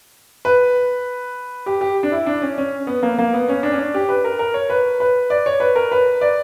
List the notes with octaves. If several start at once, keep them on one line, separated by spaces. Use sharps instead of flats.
B4
G4
G4
D4
E4
D4
C#4
C#4
B3
A#3
A#3
B3
C#4
D4
C#4
D4
G4
B4
A#4
A#4
C#5
B4
B4
D5
C#5
B4
A#4
B4
D5